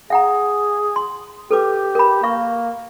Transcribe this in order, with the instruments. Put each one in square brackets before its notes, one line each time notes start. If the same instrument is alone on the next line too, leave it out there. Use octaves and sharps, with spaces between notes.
[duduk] G#4 [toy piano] F5 F#5 A#5
[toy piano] C6
[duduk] G4 [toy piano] A4 B4 D6
[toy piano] A#4 B5
[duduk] A#3 [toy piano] F5 C#6